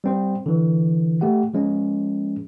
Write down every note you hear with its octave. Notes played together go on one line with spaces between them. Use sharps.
G3 C4 C5
D3 E3
A3 G4 F#5
F3 G#3 C#4